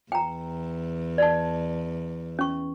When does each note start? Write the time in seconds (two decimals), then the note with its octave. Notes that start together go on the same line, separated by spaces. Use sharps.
0.12 E2 G5 A#5
1.18 D5 A5
2.39 C#4 C#6